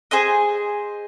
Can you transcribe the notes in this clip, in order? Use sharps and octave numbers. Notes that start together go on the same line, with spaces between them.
G#4 C5 D#5